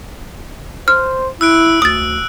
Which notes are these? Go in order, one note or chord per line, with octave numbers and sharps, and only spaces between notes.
C5 F6
E4 E6 F#6 D7
D2 D#6 A6